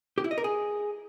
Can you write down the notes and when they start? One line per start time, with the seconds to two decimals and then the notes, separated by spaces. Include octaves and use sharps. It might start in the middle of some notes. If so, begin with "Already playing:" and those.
0.18 G4
0.24 E4
0.31 D#5
0.38 A#4
0.44 G#4